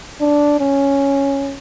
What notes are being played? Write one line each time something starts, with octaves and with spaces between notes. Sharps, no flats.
D4
C#4